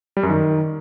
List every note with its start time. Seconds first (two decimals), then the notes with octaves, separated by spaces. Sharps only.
0.17 G3
0.23 F#2
0.30 D#3